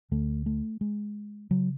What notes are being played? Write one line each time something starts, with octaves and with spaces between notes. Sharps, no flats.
D2 D3 A3
A3
G#3
C#3 F#3